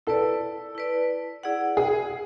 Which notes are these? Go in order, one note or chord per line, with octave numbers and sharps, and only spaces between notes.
E4 A4 B4 D5
E4 B4 D5
E4 G#4 D5 F#5
G#4